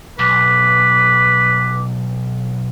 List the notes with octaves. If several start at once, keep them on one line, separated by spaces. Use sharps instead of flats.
B1 B4 D6